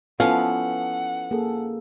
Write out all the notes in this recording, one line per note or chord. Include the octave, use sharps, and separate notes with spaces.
F3 B3 C#4 E4 A4 B4 F5 F#5
A#3 G#4 A4